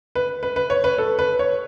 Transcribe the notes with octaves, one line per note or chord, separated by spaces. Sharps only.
B4
B4
B4
C#5
B4
A4
B4
C#5